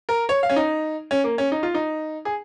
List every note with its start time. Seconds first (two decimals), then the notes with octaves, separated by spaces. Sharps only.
0.09 A#4
0.29 C#5
0.43 F5
0.49 C#4
0.56 D#4
1.11 C#4
1.24 A#3
1.38 C#4
1.52 D#4
1.63 F4
1.75 D#4
2.25 G#4